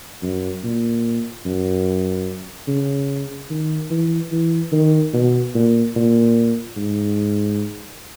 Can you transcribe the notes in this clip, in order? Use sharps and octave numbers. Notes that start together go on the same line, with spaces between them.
F#2
A#2
F#2
C#3
D#3
E3
E3
D#3
B2
A#2
A#2
G#2